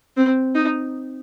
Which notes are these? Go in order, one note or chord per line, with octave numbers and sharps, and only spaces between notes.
C4
D#4